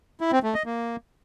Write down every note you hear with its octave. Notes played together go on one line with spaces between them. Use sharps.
E4
C4
A3
D#5
A#3